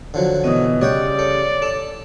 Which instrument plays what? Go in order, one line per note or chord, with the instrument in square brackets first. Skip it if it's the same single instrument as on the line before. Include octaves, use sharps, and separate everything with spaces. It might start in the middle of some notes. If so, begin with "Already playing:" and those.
[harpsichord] D3 F3 F#3
[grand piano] B2 E3 [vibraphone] D#5 D#6
[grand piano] C#3 G3 [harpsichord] C#5 F#5 G5 [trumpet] D5
[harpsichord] A4 [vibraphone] C#5
[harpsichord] A4 A5 [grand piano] E7